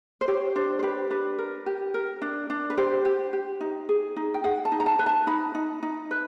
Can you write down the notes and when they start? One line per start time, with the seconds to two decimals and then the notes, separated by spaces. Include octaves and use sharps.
0.21 C5
0.28 G4 C#5
0.56 D4 C5
0.79 C5
0.83 G4 B4
1.10 D4 B4
1.38 A#4
1.66 G4
1.94 A#4
2.22 D4
2.50 D4
2.70 B4
2.77 G4 C5
3.05 G4
3.33 G4
3.61 D#4
3.89 G#4
4.16 D#4
4.34 G5
4.44 G#4 F#5
4.65 A5
4.72 D#4
4.80 A#5
4.86 A5
4.99 B4
5.06 A5
5.27 D#4 B5
5.55 D#4
5.83 D#4
6.11 B4